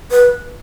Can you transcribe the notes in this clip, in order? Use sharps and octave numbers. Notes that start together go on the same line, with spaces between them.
B4